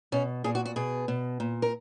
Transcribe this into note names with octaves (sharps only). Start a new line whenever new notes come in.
B2 C#4
A#2 G#4
F#4
F#4
B2 G#4
B2
A#2
A#4